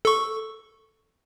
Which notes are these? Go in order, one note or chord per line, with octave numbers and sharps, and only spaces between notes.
A4 C#6